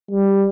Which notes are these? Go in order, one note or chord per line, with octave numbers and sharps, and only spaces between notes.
G3